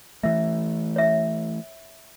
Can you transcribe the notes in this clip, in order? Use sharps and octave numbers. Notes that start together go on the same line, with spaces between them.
E3 A3 E5
C#5 E5